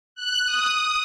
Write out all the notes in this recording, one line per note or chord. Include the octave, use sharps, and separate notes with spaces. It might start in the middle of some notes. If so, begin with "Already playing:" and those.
F#6
D#6